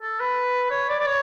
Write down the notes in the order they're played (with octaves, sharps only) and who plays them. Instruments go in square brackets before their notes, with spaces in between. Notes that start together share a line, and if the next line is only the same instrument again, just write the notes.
[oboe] A4
B4
C#5
D5
D5
C#5